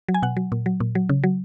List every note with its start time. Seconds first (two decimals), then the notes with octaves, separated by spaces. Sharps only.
0.08 F#3
0.14 G#5
0.22 B2 F#5
0.37 F#3
0.52 A#2
0.66 F#3
0.80 A#2
0.95 F#3
1.09 C#3
1.24 F#3